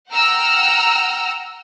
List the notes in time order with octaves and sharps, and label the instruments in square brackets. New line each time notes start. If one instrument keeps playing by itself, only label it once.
[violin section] F#5 G5 A#5 E6 F6